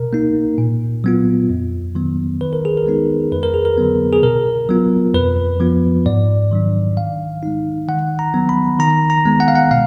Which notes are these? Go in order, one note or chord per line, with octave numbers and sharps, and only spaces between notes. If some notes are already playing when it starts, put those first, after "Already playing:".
Already playing: B2 A#4
A#3 D#4
A#2
F#3 B3 F4
F2
D#3 F#3 B3
D#3 B4
A#4
G#4
A#4
G#3 B3 D#4
F2 B4
A#4
G#4
A#4
D3 F#3 B3
G#4
B2 A#4
F#3 B3 F4
F2 B4
F3 B3 F4
G#2 D5
D#3 F#3 D4
D#3 F5
G#3 D#4
D#3 F#5
A#5
F#3 B3
B5
D#3 A#5
A#5
G#3 B3
F#5
F5
F#5
B2 F5